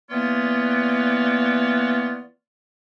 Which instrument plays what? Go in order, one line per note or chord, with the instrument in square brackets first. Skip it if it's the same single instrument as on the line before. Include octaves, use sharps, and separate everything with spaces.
[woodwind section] E3 A#3 B3 F4 C#5 D5